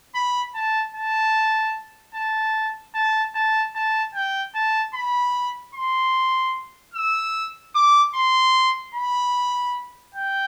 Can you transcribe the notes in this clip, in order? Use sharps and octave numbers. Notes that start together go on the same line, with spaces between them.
B5
A5
A5
A5
A5
A5
A5
G5
A5
B5
C6
E6
D6
C6
B5
G5